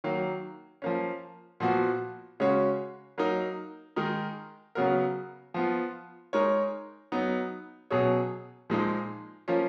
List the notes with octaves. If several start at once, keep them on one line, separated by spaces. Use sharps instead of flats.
D#3 F#3 A#3
F3 A#3 C#4
A#2 F3 B3 F#4
C#3 G#3 C#4 F#4 C#5
F#3 A#3 D#4 A#4
D#3 G#3 D#4 A#4
C#3 F#3 B3 F#4 A#4
F3 B3 F4
G#3 D#4 A#4 C#5
F#3 B3 D#4
B2 F#3 C#4 G#4 C#5
A#2 F3 G#3 D#4
F3 A#3 C#4 F4